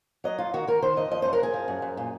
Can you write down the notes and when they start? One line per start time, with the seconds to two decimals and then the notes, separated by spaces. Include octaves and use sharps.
0.24 F#3 D#5
0.38 F2 F4
0.54 D#3 F#4
0.67 D#3 A#4
0.82 D#3 C5
0.96 F2 D#5
1.11 F3 D#5
1.22 C5
1.25 F#2
1.33 A#4
1.40 F#2 G#4
1.54 F3
1.68 F#2
1.82 F#2
1.97 A#2